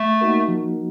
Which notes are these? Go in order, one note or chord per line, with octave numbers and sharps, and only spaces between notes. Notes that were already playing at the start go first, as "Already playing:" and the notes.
Already playing: A3
A#3 D#4 F#4 A#4
F3